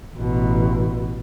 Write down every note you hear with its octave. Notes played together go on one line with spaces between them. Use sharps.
A1 B2